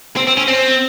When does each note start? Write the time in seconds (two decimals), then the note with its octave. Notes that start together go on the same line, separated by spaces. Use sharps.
0.17 C4
0.27 C4
0.37 C#4
0.48 C4